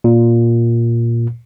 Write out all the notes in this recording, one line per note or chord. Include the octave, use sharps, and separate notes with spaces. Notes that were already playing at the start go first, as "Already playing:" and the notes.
A#2